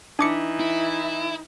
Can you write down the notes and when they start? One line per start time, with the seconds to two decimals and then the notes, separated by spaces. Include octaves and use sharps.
0.19 E3 D4 D#4 D6 C#7
0.60 E4